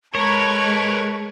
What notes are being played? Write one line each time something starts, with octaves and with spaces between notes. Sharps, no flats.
G#3 A#4 B4 C#5 A5 C#6 G#6